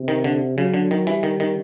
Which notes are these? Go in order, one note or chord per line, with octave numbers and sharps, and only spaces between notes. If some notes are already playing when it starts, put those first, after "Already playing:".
Already playing: C3
D#3
D3
C#3 F#3
D3
D#3
E3 G3
D#3
D#3